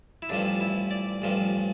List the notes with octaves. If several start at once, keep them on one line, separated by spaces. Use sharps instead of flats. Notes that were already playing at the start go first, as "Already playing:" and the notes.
E4
A1 G2 F3 D4
E4
D5
A1 G2 F3